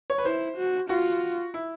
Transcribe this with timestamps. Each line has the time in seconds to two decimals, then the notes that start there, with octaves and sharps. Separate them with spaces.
0.10 C#5
0.18 B4
0.25 E4 C5
0.57 F#4
0.89 F4 F#4
1.54 E4